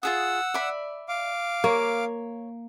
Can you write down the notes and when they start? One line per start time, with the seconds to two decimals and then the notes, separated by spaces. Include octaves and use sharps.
0.03 F4 G#4 F#5 D#6 E6
0.54 D5 E5 B5
1.09 F5 D6
1.64 A#3 C#5